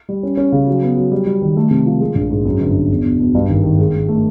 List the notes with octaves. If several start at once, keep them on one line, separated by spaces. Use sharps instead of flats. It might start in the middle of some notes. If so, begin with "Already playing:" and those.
G3
C#4
C#4
C#3
F#3
B3
F#3
G3
G3
D#3
A3
C3
F3
G#3
A#1
G#2
F#2
G1
G1
E2
B2
B2
G2
G#1
D#3
G#2
G#2
A3